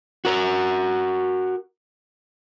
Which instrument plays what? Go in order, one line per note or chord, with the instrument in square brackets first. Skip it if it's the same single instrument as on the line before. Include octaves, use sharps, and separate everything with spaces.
[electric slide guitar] F#4 A#4